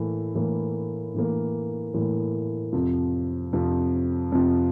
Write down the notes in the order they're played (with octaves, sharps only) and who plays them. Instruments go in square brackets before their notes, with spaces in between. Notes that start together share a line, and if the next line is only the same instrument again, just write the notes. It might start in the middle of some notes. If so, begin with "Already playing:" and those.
Already playing: [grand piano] A2 E3 A#3
A2 E3 A#3
A2 E3 A#3
A2 E3 A#3
F2 C3 F3
F2 C3 F3
F2 C3 F3